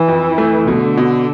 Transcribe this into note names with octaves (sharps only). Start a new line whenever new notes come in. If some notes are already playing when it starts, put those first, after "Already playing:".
Already playing: E3
F2
A3
B2 D3
B2